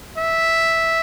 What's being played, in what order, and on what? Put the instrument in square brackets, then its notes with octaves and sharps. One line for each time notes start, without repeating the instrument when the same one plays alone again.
[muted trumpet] E5